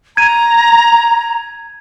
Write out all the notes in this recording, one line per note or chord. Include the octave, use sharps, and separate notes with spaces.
A#5 G#6 D#7